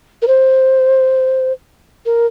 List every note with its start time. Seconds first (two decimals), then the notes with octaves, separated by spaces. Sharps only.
0.22 A#4
0.27 C5
2.06 A#4